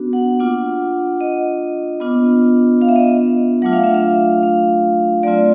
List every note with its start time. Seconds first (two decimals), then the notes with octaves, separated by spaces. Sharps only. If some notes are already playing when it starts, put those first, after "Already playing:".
Already playing: B3 D4 F#4
0.13 F#5
0.40 A#3 D4 F4
1.21 D#5
2.00 B3 D4 F4
2.81 F5
2.89 E5
2.96 D#5
3.04 E5
3.62 F#3 A3 D4 F4 F#5
3.73 F5
3.84 E5
3.94 F5
4.43 F5
5.23 F#3 A3 C4 F4 D5